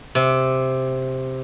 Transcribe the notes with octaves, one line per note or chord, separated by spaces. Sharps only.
C3